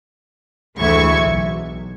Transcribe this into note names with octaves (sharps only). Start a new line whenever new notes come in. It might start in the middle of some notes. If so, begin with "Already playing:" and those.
D2 E3 G#3 E5 C#6 G#6
B1